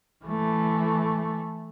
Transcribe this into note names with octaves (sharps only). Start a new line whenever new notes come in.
E3 A3